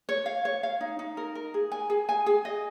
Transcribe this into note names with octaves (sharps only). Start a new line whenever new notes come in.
C#5
F5
C#5
F5
D#4
D#4
A#4
A#4
G#4
G#5
G#4
G#5
G#4
D#5